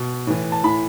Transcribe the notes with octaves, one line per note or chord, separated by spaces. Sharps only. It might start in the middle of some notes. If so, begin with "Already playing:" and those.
Already playing: B2
A2 E3
A5
A2 E3 B5